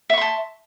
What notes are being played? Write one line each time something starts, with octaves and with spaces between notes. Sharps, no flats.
E5 A5 C6 C#6